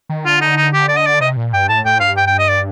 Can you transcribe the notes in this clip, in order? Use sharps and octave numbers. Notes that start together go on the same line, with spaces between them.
D#3
D3 F4
D#4
D#4
G4
D5
D#5
D5
C3 D#5
A#2
G2 G5
A2 A5
A2 G5
G2 F5
G5
G5
D#5
D5